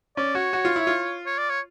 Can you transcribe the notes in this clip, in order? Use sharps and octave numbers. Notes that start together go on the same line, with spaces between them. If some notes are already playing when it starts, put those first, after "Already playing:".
C#4 D5
F#4 C#5
F#4
F4
E4
F4
C#5
D5
C#5